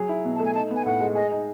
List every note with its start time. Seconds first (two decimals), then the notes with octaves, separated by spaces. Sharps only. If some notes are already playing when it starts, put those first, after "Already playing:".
Already playing: F#3 G#4
0.09 E4
0.25 B2
0.35 A5
0.39 A3
0.45 G#5
0.54 D#4 A5
0.71 B3
0.76 G#5
0.85 A2 F#5
1.01 G#3
1.15 G#4 D#5
1.31 D#4